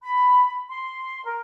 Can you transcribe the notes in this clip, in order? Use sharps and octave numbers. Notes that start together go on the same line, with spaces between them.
B5
C6
A#4